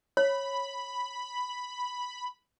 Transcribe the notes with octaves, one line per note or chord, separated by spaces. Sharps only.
C#5 B5